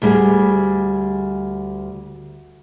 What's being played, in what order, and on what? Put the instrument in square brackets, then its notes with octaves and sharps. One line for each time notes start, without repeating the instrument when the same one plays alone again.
[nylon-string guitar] D2 G3 G#4